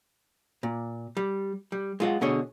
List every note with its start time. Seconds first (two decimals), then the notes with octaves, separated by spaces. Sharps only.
0.63 A#2
1.17 G3
1.72 G3
2.00 G#3 F4 F#5
2.21 B2 D3 G#4 C#5